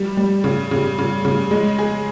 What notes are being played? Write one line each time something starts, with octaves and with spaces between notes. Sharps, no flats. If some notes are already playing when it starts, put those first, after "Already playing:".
Already playing: G3
G3
C#3
C#3
C#3
C#3
G#3
G#4